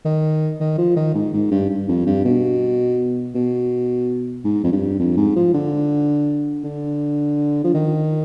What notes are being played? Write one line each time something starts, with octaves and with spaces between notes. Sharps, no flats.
D#3
D#3
F3
D#3
G#2
G#2
G2
G2
F2
G2
B2
B2
G#2
F2
G2
F2
G#2
F3
D3
D3
F3
D#3